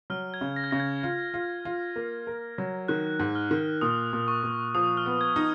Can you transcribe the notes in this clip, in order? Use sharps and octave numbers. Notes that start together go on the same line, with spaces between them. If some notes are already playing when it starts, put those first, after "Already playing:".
F#3 F6
G#6
C#3
A#6
G#6
C#3 A#6
G#6
F4
F4
F4
A#3
A#4
F#3
D#3 F#6
G#2
F6
D#3
A#2 D#6
A#2
C#6
A#2
F3 D#6
F6
B3
G#6
D#4